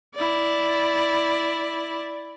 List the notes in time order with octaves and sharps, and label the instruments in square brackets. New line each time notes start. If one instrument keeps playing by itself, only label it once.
[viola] E4 D5